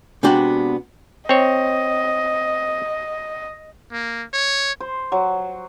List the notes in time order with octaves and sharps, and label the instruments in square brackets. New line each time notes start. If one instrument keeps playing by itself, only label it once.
[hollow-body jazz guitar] C3 G#3 B3 D4 F#4 G5
[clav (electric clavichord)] C4 C#5 [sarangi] D#5
[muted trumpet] A#3
C#5
[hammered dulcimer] C5
F#3